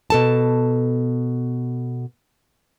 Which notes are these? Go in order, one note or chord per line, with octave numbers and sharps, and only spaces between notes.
B2 A4 A5